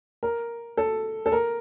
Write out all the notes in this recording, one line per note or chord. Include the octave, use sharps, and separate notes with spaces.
A#4
A4
A4
A#4